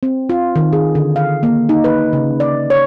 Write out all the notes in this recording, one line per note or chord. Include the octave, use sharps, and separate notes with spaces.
C4
F4
D#3
G#4
D3
F5
A#3
D#4
B4
C#3
D5
C#5